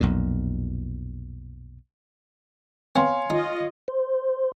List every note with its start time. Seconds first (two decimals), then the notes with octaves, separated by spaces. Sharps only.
0.01 B1 F2 A#2
2.96 B3 C4 C#5 F5 G#5 C6
3.30 D#4 F4 D#5
3.88 C5